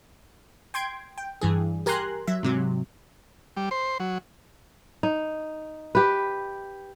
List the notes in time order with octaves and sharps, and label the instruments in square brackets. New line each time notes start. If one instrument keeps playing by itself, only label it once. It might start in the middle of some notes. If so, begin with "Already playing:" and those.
[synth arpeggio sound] G5 C6 G#6 D7
G5
G2 E3 G#4
G4 A#4 G#5 A#5 C6 F#6
F#3 E5
G#2 C3 F#3
[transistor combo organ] G3
C5
F#3
[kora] D#4
G4 B4